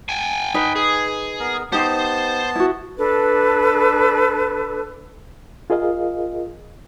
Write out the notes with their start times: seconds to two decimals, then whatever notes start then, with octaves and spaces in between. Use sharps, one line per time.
0.09 G5 G#5
0.54 D#4 B4
0.76 G#4
1.40 B3 A#4
1.72 B3 D#4 G4 C5 A5
2.56 E4 F#4
2.97 D4 A4 B4
5.70 F4 G#4 A#4 D#5 F5